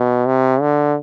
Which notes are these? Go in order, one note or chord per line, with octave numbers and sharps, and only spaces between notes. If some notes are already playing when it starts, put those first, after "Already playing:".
Already playing: B2
C3
D3